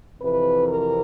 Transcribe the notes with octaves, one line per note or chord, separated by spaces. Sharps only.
F2 C3 E3 B4
A#4